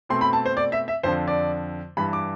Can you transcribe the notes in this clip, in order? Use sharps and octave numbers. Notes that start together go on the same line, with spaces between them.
B2 A3 C4 C6
B5
A5
C5
D5
E5
E5
F2 D3 F3 C5
D5
G2 E3 G3 B5
D6